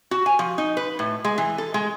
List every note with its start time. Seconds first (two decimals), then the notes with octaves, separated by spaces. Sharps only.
0.11 F#4
0.26 G#5
0.39 F3
0.58 D#4
0.77 B4
0.99 A2
1.25 G#3
1.38 E3
1.58 A4
1.74 G#3